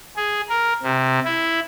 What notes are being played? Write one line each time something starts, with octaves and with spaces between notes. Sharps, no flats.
G#4
A#4
C3
E4